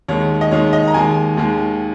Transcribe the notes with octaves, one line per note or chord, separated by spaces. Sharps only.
D#2 D#3 G#3 C#5
D#5
D#2 D#3 G#3 C#5
D#5
A#5
D#2 D#3 G#3 G#5
D#2 D#3 G#3